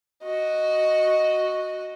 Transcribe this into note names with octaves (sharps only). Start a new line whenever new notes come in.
F#4 D#5